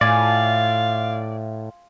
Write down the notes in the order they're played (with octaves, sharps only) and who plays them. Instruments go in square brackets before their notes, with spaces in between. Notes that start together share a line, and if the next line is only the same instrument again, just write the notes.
[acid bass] A2 [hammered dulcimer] F4 G#5 [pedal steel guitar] D5 [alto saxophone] F5